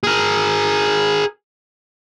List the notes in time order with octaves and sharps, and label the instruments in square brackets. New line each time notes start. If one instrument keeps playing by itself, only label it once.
[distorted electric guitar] G#4 A#4